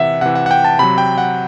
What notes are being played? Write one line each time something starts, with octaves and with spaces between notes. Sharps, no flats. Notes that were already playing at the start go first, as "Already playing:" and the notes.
Already playing: C3 E3 E5 F#5
C3 E3 F#5
F#5
F#5
G5
A5
C3 F#3 B5
G5
F#5